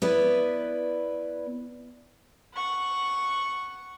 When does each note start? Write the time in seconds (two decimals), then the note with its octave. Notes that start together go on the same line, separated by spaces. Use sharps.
0.02 B3 E4 B4 D5
2.54 F#5 C#6